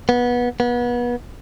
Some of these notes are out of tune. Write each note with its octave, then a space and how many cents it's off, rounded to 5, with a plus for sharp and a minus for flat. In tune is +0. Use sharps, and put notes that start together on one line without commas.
B3 -20
B3 -30